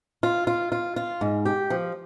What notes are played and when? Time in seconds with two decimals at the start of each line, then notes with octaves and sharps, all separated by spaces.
0.23 F4
0.47 F4
0.72 F4
0.96 F4
1.21 G#2
1.45 G4
1.70 F3